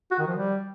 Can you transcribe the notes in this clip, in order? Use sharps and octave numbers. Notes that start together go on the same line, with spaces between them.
F#4
D#3
F3
G3